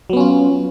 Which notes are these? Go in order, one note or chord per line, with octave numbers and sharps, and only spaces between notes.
F#3 B3 C#4 F4